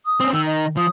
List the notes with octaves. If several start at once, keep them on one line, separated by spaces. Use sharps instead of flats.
D#6
C4 C#4
D#3 E6
D#5
F3 D#6